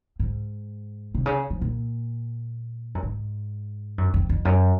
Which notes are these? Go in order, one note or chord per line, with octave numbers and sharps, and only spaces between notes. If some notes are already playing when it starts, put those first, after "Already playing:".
G#2
C3
C#3
F3
A#2
F#2
G#2
F#2
F2
F2
F#2